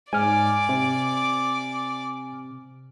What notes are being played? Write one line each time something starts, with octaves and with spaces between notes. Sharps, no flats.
G#2 D5 G#5 D6 F6
C3